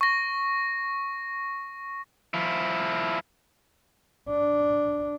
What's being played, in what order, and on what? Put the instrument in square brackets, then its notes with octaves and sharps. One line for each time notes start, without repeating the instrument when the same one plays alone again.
[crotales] C#6 A#6
[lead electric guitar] F3 E4
[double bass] D4